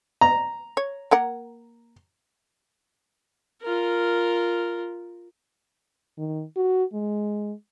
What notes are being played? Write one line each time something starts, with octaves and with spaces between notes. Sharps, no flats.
A#5
C#5
A#3 A#4 F#5
F4 A#4
D#3
F#4
G#3